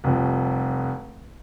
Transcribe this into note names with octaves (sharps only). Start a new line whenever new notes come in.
F1 C2 F2